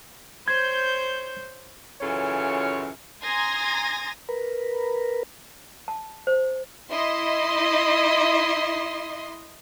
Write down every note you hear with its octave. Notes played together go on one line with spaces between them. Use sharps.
C5 C#5 G6 G#6
F#2 C#3 E3 F4 A4 C#5
G#5 A#5 C6 D#6 G#6 A#6
A#4 B4
A5
C5
E4 D#5 C6